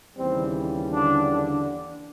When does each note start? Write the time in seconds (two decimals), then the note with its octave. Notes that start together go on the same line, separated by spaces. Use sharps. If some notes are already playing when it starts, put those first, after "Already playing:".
0.16 D#2 C#3 E3 G3 C4
0.92 D3 D4
1.30 D3 D4